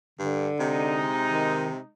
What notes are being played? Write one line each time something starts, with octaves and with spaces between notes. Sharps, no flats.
G2 D3
C3 G#3 D#4
D#3